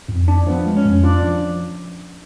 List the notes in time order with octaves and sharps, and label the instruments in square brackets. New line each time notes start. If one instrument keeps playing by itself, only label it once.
[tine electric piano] F2
D4
[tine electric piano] F3 [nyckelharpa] B3
[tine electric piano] G#3
[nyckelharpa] C#4
[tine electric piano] F2
[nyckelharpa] D4 [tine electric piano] F4
[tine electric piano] F3